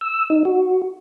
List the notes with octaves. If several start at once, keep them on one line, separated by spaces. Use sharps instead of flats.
E6
D#4
F#4